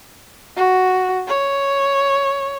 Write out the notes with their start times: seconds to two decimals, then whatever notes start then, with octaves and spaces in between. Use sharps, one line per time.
0.56 F#4
1.27 C#5